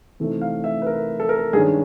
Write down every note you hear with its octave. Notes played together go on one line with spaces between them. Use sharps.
C3 E3 A3 C4 D#4
F5
E5
B4
A#4
A4
A#4
A4
G2 D#3 G#3 C#4 G#4